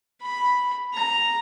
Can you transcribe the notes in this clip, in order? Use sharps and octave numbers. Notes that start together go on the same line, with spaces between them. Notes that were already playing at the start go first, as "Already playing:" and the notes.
B5
A#5